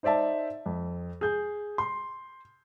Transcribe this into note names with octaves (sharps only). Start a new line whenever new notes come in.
D#4 C5 D5 E5 A5
F2
G#4 G6
C6